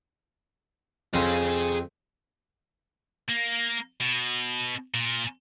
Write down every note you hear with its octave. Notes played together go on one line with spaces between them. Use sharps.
F2 C4 G#4 F5
A#3
B2
A#2